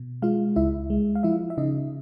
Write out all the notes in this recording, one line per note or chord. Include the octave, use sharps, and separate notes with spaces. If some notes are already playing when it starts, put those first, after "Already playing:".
Already playing: B2
G#3 F4 F5
C#2 E4 E5
G#3
F5
F3 E4 E5
E5
C#3 D#4 D#5